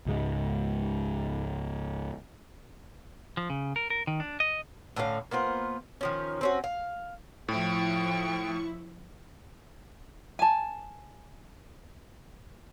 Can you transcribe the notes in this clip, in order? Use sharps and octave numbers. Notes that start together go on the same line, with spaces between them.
C#2 G#2 G#3
F3
C#3
A#4
A#4
D#3
D4
D#5
A2 D3 C#4 F5
A#3 B3 F4 C5
D#3 F3 C#4
C4 C#4 F#4
F5
A2 F3 E4 G5 C#6
G#5 A5